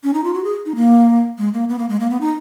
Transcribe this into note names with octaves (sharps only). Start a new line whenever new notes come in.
C#4
D#4
F4
F#4
G#4
D#4
A#3
G#3
A#3
B3
A#3
G#3
A#3
B3
D#4